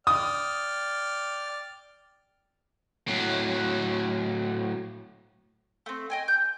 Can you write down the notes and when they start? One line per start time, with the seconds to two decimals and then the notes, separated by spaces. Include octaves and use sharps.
0.07 D5 G5 D#6 F6
3.08 A2 F#3
5.86 A3 C4
6.10 D#5 G5 G#5
6.28 G6